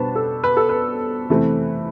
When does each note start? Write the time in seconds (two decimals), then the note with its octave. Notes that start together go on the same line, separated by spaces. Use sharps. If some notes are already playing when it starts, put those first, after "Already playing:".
Already playing: B2 G3 B3 D4 B4 C5 A5
0.16 A4
0.44 B4
0.57 A4
0.69 B4
1.29 C3 E3 A3 C4